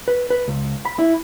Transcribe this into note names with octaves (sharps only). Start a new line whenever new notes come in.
B4
B4
C#2
B5
E4